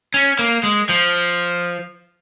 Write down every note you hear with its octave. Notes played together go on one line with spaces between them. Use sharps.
C#4
A#3
G#3
F3